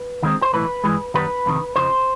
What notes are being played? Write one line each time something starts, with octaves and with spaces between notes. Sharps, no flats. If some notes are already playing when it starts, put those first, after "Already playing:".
Already playing: B4
D#2 D#3 G#3 C4
C5
B1 A2 E3 B4
G2 E3 G#3
F#2 D#3 G3 B3 B4
F2 C3 D#3
F2 C#3 F3 C5